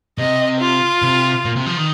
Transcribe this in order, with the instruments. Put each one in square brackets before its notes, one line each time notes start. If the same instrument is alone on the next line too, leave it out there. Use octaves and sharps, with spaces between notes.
[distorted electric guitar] C3 [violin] D#5
[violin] F4
[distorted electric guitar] C3
A#2
C3
F3
D#3